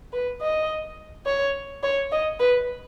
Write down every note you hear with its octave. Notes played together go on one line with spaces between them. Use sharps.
B4
D#5
C#5
C#5
D#5
B4